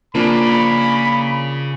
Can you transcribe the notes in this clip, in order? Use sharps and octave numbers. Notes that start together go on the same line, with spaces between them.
C#3 F3 A#3 D4 B5